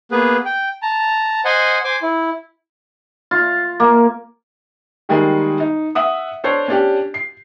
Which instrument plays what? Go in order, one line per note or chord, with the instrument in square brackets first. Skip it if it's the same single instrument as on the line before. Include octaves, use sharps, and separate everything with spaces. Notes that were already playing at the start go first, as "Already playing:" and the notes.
[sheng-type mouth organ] A#3 B3 G#4 B4
G5
A5 A#5
C5 D#5 F#5 G#5
C5 G#5 D6
E4
[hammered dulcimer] F4
A#3
[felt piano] D#3 G3 G#3 A#3 D#4 G#4
D#4
E5 F#5 D#6
D4 A4 C5 C#5
C#4 D4 G4
C7